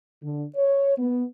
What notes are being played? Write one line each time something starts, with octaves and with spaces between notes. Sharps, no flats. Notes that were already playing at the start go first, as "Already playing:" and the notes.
D3
C#5
B3